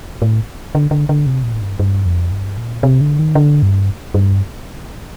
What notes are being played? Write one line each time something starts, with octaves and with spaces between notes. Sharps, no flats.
A2
D3
D3
D3
C3
A#2
A2
G2
G2
F2
G2
A#2
C3
D3
D#3
D3
G2
G2